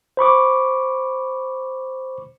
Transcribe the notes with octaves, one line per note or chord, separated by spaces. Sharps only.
C5 B5 C#6 D6